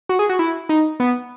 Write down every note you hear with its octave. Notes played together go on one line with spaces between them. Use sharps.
F#4
G#4
F#4
E4
D#4
B3